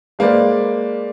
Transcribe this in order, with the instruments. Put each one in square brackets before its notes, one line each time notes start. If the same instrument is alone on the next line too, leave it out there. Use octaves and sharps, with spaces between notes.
[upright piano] G#3 A#3 B4 C5 D5